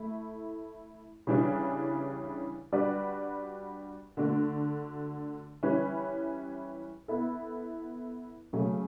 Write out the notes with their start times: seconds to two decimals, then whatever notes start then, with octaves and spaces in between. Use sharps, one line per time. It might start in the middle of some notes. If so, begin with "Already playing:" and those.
Already playing: A3 E4
1.27 C#3 E3 G3 D4
2.72 G3 D4 F#4 B4 D5
4.17 D3 A3 D4 F#4
5.63 E3 G3 C#4 E4 B4
7.08 B3 E4 A4
8.53 C#3 F#3 A3